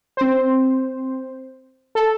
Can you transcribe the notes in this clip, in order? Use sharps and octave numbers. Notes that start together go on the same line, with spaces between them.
C4 C5
A4